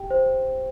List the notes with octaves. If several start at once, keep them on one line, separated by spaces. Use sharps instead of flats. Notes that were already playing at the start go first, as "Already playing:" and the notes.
Already playing: G4 G5
C5